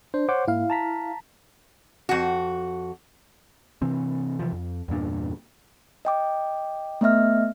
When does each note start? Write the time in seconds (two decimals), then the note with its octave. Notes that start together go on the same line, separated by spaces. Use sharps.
0.14 D4 C5
0.29 C5 C#5 F#5 D6
0.48 G#2 A#3 E4 F5
0.70 A5 A#5 B6
2.09 F2 F#4
3.82 C3 E3 C4
4.39 C3 E3 F3
4.52 F2
4.88 E2 G2 A#2 D4
6.05 D#5 G5 D6
7.01 A3 B3 D#5 E5 F6